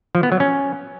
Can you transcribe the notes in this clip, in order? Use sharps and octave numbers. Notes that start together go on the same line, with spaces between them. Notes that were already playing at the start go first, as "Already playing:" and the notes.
F3
B3
F#3
C#4